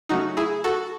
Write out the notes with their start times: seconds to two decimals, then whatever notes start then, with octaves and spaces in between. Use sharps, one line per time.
0.09 C#3 F#3 A3 C#4 D#4 F#4
0.37 E4 G#4
0.64 F#4 A4